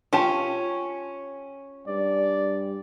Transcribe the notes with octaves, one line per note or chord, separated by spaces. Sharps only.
C#4 F4 G4 A5
G2 D5